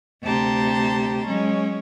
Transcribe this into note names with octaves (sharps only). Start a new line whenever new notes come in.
D2 C3 G4 A5 A#5 C6
F#3 G#3 C#4